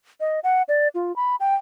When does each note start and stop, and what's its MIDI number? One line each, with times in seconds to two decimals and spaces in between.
0.20 0.40 75
0.44 0.63 78
0.68 0.88 74
0.95 1.15 65
1.16 1.36 83
1.40 1.55 79